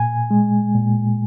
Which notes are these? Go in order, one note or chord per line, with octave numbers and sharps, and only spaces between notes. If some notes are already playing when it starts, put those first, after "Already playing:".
Already playing: A#2 G#5
G#3
A#2